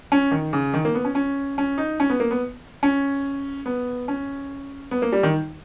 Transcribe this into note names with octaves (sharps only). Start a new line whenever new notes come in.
C#4
D#3
C#3
D#3
A#3
B3
C#4
C#4
C#4
D#4
C#4
B3
A#3
B3
C#4
B3
C#4
B3
A#3
G3
D#3